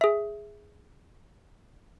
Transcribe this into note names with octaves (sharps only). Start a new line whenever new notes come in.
G#4 E5